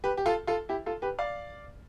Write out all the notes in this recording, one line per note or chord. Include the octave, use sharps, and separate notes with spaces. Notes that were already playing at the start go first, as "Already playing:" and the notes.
G4 B4
G4
F4 A4
F4 A4
E4 G4
F4 A4
G4 B4
D5 F5